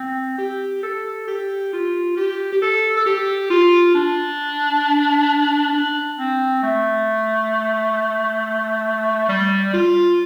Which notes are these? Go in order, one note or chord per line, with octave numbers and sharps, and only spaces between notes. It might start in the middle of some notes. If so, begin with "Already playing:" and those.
Already playing: C4
G4
A4
G4
F4
G4
G4
A4
A4
G4
F4
D4
D4
C4
A3
G3
F4